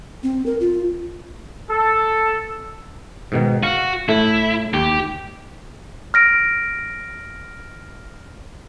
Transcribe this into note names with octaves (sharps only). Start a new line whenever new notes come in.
C4
A#4
F4
A4
G#2 B2 D#3
F#4 F5
A2 A3 E4
D#2 G4
F6 A#6 D7